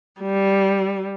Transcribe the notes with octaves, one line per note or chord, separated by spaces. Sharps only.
G3